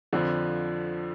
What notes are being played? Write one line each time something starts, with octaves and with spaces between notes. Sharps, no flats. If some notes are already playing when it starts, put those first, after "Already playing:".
F2 D3 F3